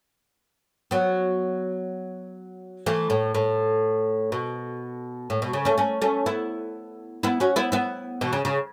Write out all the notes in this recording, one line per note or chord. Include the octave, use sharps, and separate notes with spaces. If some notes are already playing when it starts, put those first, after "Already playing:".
F#3 B3
E3 A3
A2
A2
B2
A2
B2
C#3
A3 C#4
A3 C#4
A3 C#4
B3 E4
B3 E4
C#4 F#4
B3 E4
B3 E4
B2 E3
C#3
C#3